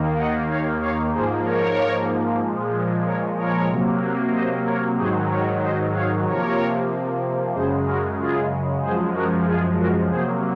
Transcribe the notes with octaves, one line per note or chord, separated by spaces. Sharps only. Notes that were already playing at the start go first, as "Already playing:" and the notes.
Already playing: D#2 D#3 A#3
D#5 F#5
C#5 F5
C#5 F5
G#2 F3 A#3 G#4 C5
A#4 C#5
A#2 F3 G#3
A#4 C#5
A#4 C#5
C3 F#3 A#3
C5 D#5
A#4 C#5
G#2 D#3 F#3 G#4 C5
A#4 C#5
C5 D#5
C#5 F5
C3 F3 A#3 A#4 C#5
F#2 C#3 G#3 G#4 C5
F#4 A#4
F4 G#4
F#2 F3 G#3 G#4 C5
F#4 A#4
F4 G#4
F#4 A#4
C3 F#3 A#3 G#4 C5